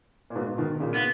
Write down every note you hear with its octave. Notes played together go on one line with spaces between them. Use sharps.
A#2
G#2 B2
B2 D#3
A#2 C#3
B3